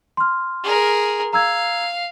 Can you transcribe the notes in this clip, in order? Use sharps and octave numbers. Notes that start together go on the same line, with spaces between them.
C6 F6
G#4 A#4
F5 A#5 E6 G#6